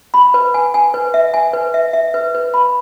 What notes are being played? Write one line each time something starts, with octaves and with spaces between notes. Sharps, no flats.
B5
B4
G#5
G#5
B4
E5
G#5
B4
E5
E5
B4
B4
B5